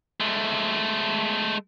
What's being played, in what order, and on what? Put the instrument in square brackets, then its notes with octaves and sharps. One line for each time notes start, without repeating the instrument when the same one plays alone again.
[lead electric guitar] G#3 A3